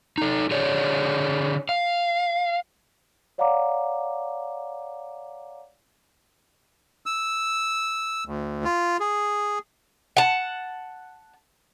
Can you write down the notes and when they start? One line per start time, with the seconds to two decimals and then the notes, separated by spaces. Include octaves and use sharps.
0.18 D#4 A4
0.51 D3 G#4 C#5 D5
1.69 F5
3.38 C#5 D5 F5 F#5 A#5 D6
7.06 E6
8.26 D2
8.65 F4
9.00 G#4
10.17 F#5 A5